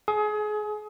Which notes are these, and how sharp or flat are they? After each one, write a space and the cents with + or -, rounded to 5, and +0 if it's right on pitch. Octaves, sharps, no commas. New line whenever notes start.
G#4 +30